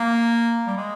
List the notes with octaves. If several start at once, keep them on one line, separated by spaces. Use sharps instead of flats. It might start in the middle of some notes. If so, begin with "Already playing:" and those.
Already playing: A#3
G3
G#3